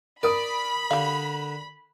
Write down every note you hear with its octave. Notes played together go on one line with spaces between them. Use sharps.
A#4 D5 B5 D#6 D7
D3 G3 F5